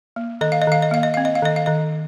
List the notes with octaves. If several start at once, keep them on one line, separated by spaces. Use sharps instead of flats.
A#3
D#3 D#5
F5
D#5
D#3 F5
D#5
A#3 F5
D#5
C4 F5
D#5
F5
D#3 D#5
F5
D#3 D#5